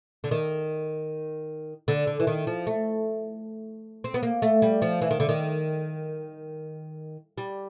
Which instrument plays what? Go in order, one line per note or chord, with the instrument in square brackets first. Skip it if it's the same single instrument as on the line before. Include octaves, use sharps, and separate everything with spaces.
[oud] D3
D#3
D3
D3
E3
D#3
F3
A3
C4
B3
A#3
A3
G3
F3
E3
D#3
D3
D#3
G3